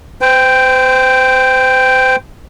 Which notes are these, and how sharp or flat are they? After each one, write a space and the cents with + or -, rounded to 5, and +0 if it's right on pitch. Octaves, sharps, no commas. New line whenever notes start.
C5 -35 G5 +0